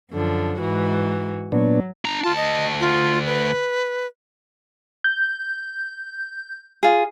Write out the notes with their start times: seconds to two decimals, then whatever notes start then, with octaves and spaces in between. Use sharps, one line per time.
0.12 F#2 D3 F3
0.59 G#2 E3 F#4
1.52 A#2 F#3 B3 D4
2.05 D4 A#5
2.24 D2 F4 A5
2.36 D#5
2.80 F4
3.26 B4
5.04 G6
6.83 F4 G#4